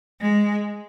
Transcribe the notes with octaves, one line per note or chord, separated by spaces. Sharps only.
G#3